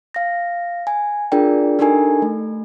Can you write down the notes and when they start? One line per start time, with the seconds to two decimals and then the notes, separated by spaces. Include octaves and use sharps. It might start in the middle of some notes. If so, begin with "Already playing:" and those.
0.14 F5 A#6
0.87 G#5
1.32 D4 F4 G#4 A#4 D5 G5
1.79 D4 D#4 G4 A4 A#4 G#5
2.22 A3